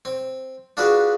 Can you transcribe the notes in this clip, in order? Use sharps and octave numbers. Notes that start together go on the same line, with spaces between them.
C4
D4 F4 F#4 G#4 B4 F5